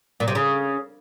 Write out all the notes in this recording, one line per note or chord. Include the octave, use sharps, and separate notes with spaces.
A#2
C3
C#3